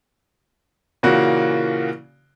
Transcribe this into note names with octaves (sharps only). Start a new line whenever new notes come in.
A#2 C#3 E3 A#3 F#4